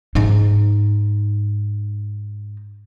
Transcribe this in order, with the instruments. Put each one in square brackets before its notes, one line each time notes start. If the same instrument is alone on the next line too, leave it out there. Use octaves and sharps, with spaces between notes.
[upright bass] G#2 D#4